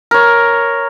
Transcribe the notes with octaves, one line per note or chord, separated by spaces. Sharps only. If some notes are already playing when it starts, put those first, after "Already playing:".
A#4 C#5